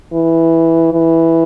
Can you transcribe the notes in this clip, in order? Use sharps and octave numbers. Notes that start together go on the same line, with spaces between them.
E3
E3